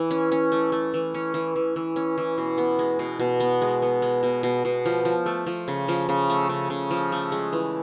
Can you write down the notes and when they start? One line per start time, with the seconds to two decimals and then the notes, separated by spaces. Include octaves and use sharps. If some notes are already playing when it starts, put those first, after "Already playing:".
Already playing: E3
0.11 C#4
0.32 C#4
0.52 A3
0.72 A3
0.94 E3
1.14 C#4
1.34 E3
1.56 E3
1.76 E3
1.96 C#4
2.18 E3
2.38 B2
2.58 B3
2.79 G#3
2.99 B2
3.20 B2
3.40 B3
3.61 G#3
3.82 B3
4.02 G#3
4.23 B2
4.43 B2
4.65 B2
4.86 F3
5.05 F3
5.26 A3
5.47 F3
5.68 C#3
5.88 F3
6.09 C#3
6.30 A3
6.50 C#3
6.70 C#3
6.91 F3
7.12 A3
7.32 G#3
7.53 E3